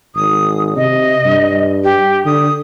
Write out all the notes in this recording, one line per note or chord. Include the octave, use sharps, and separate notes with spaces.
G#1 D#6
C3 D#5
G2
G4
D3 D#6